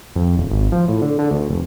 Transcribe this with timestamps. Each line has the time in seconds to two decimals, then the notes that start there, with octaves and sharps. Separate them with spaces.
0.16 F2
0.37 D#1
0.50 G#1
0.72 F3
0.88 A2
1.02 D3
1.19 D3
1.31 D2
1.50 F1